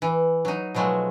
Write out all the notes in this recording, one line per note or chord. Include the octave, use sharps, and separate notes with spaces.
E3
F#3 D#4
B2 F3 F#3 G#3 A3